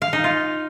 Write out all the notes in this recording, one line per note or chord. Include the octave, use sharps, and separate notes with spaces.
F5
D#4
F4